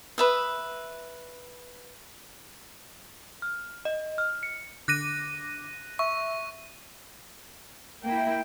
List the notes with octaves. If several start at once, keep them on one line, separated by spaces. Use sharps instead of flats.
B4 E5 D#6
F6
D#5
F6
C#7
D3 D6 F#6 A#6 D#7
E5 C#6
A#3 E4 G5